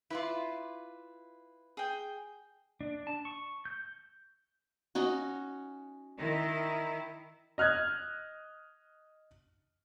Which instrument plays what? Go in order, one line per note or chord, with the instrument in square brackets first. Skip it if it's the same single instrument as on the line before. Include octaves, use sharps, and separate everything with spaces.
[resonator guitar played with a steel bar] E4 F4 [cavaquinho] B4 D5 C6
[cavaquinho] G#4 G5
[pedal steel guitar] D4
A5
C#6
G6
[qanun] C#4 D#4 F#4
[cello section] D#3 E4
[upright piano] D#5 F6 F#6 G#6